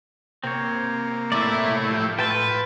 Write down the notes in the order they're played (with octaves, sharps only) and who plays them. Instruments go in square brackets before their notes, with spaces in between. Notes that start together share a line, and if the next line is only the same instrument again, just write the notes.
[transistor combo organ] C3 A#3 [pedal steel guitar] C4 C#5
[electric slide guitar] A3 E4 [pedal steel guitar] D5 E5
[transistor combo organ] F3 G4
[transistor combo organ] A2 F4 [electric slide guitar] B4 [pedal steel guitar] G5 A5 C6